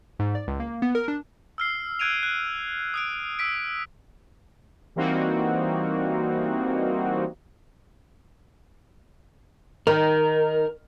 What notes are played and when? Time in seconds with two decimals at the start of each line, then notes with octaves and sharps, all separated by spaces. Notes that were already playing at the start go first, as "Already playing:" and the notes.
0.19 G#2
0.35 D5
0.47 C#2
0.60 A#3
0.82 B3
0.95 A#4
1.08 D4
1.58 E6 F6 C7
1.99 E6 F#6 G#6 D7 D#7 F7
2.23 F#6
2.94 D#6 F#6 D7
3.39 E6 B6 D7
4.96 E3 G3 A#3 C4 D#4 F#4
9.87 D#3 A#4